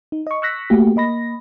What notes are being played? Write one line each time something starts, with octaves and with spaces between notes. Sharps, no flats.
D#4
D#5 C#6
C#6 E6 F#6 A#6 B6
A3 A#3 F#4 G4
A#3 D#5 B5 A#6